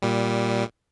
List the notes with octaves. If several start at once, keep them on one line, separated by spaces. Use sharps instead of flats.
A#2 G3